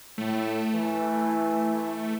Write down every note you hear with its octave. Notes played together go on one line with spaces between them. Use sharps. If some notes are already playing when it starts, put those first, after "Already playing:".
A2 A3
E3